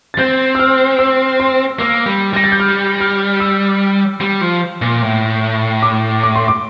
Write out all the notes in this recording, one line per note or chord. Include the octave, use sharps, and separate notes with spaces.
A6
C4 G6
E6
F6
E6
C6
A#3 E6
G3
G3 A#6
A6
G6
F6
F6
E6
G3
F3
A#2
A2
D6
D6
C6
D6